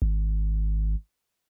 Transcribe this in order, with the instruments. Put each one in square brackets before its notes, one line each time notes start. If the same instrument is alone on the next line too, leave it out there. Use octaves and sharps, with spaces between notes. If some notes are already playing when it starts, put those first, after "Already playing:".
[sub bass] G#1